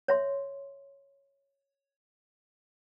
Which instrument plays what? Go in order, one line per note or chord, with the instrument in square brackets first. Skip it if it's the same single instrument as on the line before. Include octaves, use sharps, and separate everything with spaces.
[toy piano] C#5 E5 C6